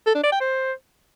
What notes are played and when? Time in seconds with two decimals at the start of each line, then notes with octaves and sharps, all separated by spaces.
0.06 A4
0.15 D4
0.23 D5
0.32 G5
0.40 C5